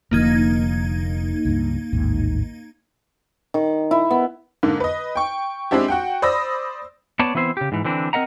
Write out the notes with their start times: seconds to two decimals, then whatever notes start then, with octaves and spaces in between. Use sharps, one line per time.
0.11 F1 D3 F3 A#3 D#4 G#6
1.45 C#2 G2
1.93 A1 D#2 G#2
3.54 D#3
3.91 E4
4.11 B3
4.63 G#2 D3 A#3
4.80 B4 D#5
5.15 G5 C#6
5.71 G#3 C4 D4 E4 G4
5.88 F#4 F#5 G5
6.22 C5 D5 B5 D#6 E6 A#6
7.19 B3 C#5 D5 A5
7.35 E3 B3 C4 E4 C5
7.57 C#3 G4
7.72 G#2 E3
7.85 D3 E3 C4 D4
8.13 C4 A#4 D#5 F#5 A#5